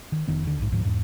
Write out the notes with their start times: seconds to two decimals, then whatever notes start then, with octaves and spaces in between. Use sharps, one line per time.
0.12 D#3
0.28 F1 D#3 B3
0.44 D#2 D3
0.58 A#1 G#2
0.72 D2 G#2 F3
0.85 E2 G#2